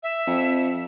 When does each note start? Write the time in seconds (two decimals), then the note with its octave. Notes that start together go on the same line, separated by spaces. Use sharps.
0.03 E5
0.27 F2